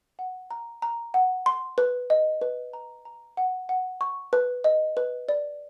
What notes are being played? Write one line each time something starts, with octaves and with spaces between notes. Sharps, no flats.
F#5
A#5
A#5
F#5
C6
B4
D#5
B4
A#5
A#5
F#5
F#5
C#6
B4
D#5
B4
D5